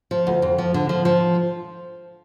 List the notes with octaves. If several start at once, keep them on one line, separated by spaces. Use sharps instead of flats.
F3
D2
F2
F3
D3
F3
F3